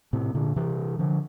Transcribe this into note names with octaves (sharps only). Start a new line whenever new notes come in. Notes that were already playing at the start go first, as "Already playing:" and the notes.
A2 C3
A#2 D3
C3 E3
D3 F3